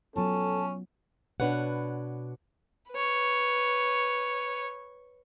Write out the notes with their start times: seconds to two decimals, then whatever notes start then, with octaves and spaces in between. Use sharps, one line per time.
0.16 F#3 B3 C#4 F4 A4 A5
1.40 B2 D4 B4 C#5 F#5
2.91 B4 C#5